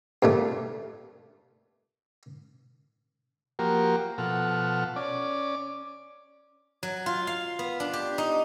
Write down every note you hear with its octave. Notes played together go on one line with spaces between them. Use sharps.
G2 A#2 A3
F3 A#3 F#4 G4 A#4
B2 F3 A4 F#5 F6
C#4 D5 D6
F#3
F4
F5
B3
D4
G4
D#4